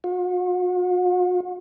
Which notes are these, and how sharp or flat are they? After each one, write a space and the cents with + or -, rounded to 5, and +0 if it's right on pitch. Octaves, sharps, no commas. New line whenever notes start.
F#4 -45